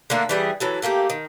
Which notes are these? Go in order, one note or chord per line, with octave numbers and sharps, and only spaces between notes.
D3 A3 A#3 D4
E3 G3 G#4
E3 F#3 A4
A3 A#3 F#4 G4
D#3